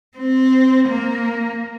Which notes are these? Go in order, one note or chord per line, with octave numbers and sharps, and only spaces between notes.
C4
A#3